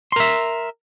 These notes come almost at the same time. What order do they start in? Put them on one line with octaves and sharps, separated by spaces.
C6 A#4 E5